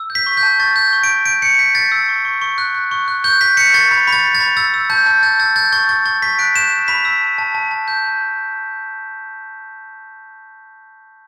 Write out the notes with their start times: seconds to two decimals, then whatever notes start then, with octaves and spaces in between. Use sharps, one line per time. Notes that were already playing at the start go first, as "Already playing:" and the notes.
Already playing: E6
0.10 G6
0.15 B6
0.26 C#6
0.37 G6
0.43 A5
0.59 C#6 A6
0.76 G6
0.93 C#6
1.04 D7
1.10 C#6
1.26 G6 D7
1.42 G6 C#7
1.59 G6 B6
1.75 G6 A6
1.92 E6
2.09 C#6
2.25 C#6
2.41 C#6
2.58 F#6
2.75 F#6
2.91 C#6
3.08 F#6
3.24 C#6 G6
3.41 C#6 B6
3.57 G6 C#7
3.74 C#6 A6
3.91 B5 A6
4.07 B5
4.12 A6
4.24 B5
4.35 A6
4.40 B5
4.57 E6 A6
4.74 E6
4.90 A5 G6
5.06 A5
5.23 G6 A6
5.39 E6 A6
5.56 G6 A6
5.72 C#6 A6
5.89 C#6 A6
6.06 C#6 A6
6.22 C#6 B6
6.39 F#6 D7
6.55 G6 E7
6.72 E6
6.88 B5 B6
7.05 E6
7.22 A5
7.38 A5
7.55 A5
7.71 A5
7.88 G6
8.04 A5